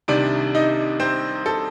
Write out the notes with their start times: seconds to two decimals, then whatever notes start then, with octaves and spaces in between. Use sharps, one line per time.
0.08 C2 C3 D#3 D4 D5
0.55 D#4 D#5
1.00 C4 C5
1.46 A4